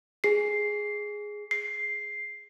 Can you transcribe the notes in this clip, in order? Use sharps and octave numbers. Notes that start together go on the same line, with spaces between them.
G#4 C7
C7